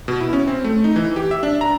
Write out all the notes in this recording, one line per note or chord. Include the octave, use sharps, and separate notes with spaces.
B2
E4
C#4
C4
A3
D#4
E3
G4
E5
D4
A#5